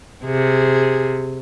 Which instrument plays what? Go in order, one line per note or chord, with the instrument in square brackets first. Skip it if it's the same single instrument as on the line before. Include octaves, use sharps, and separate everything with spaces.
[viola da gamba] C3 G#4